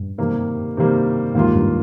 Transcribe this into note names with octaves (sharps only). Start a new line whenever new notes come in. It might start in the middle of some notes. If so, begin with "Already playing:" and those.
Already playing: G2
C3 D#3 G3 A#3
C3 D#3 G3 A#3
D#2 G#2 D#3 A#3 F4
G2